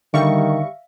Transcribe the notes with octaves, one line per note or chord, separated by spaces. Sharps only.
D3 D#3 G3 E5 F5 C#6